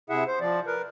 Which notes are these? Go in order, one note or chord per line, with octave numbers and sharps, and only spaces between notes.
C3 E4 G#4 E5 F#5
C5
F3 D5
A#4 B4